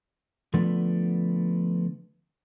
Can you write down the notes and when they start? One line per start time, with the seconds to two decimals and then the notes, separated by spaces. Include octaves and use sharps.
0.54 D3 F3 A3 B3 D4